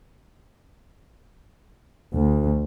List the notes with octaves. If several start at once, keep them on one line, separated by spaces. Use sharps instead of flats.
D2